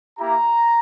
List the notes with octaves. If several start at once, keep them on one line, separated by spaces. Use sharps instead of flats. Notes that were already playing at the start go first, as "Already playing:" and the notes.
A#3 E4 G4 A#5